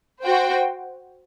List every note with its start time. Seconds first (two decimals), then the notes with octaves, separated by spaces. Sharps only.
0.22 F#4 C5 G5